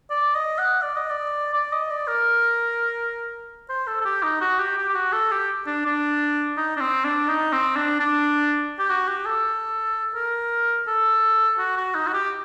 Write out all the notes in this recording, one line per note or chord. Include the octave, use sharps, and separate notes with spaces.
D5
D#5
F#5
D5
D#5
D5
D5
D#5
D5
A#4
C5
A4
A4
G4
D#4
F#4
G4
G4
G4
F#4
A4
G4
D4
D4
D#4
D4
C4
D4
D#4
C4
D4
D4
G4
F#4
G4
A4
A#4
A4
F#4
F#4
D#4
F#4
G4